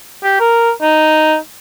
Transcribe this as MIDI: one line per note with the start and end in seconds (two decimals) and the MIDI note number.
0.24 0.35 67
0.40 0.71 70
0.82 1.36 63